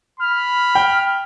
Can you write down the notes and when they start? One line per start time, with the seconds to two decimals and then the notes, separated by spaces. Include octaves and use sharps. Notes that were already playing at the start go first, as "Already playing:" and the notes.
0.20 B5 F6
0.75 G5